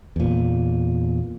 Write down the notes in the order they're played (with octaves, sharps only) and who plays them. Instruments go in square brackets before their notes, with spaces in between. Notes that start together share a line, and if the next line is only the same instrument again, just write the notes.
[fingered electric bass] E2 A#2